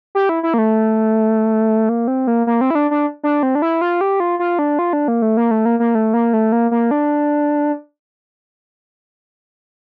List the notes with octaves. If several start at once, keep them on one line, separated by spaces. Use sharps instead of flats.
G4
E4
E4
A#3
A3
A#3
C4
A#3
A#3
C4
E4
D4
D4
D4
C4
D4
E4
F4
G4
F4
F4
D4
F4
D4
A#3
A3
A#3
A3
A#3
A#3
A3
A#3
A3
A#3
A#3
D4